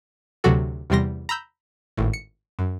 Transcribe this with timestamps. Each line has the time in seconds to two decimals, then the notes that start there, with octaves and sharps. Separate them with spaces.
0.44 D2 C3 F#3 F#4 A4
0.90 E2 C3 G3 C6 A#6
1.29 A#5 B5 E6 G6
1.97 G#1 A2
2.13 C#7
2.59 F#2